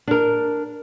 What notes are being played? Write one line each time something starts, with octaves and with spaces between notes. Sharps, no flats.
D4 A#4